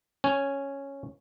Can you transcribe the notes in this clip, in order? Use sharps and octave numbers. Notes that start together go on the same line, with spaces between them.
C#4 G#5